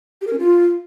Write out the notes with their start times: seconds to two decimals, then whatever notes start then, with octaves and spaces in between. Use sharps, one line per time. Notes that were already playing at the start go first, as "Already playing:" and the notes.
0.21 G4
0.27 A#4
0.33 C#4
0.39 F4